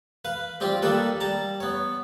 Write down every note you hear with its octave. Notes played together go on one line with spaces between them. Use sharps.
B4 F5
G3 C4 F4 G4
D#3 G3 A#3 A4 B4
G3 A5 A#5
B3 C#5